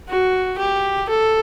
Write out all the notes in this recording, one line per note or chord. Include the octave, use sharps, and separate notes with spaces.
F#4
G4
A4